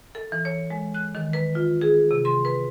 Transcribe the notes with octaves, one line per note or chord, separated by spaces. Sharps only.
A4
E3
C#5
G#3
F#6
D#3
B4
F4
G#4
C3
C6
B4